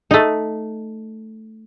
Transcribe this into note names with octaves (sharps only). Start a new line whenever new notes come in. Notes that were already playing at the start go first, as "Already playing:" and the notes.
A3 D#4